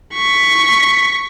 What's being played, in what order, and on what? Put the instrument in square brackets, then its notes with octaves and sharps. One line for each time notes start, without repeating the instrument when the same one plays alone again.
[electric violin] C#6 B6